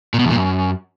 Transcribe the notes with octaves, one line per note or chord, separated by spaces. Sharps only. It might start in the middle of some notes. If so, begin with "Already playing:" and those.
A#2
B2
E2
A#2
F#2